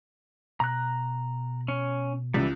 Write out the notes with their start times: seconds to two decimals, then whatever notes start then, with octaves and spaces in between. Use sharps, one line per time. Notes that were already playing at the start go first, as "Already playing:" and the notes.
0.60 B2 A#5 F#6
1.68 C#4
2.34 C#2 E3 G3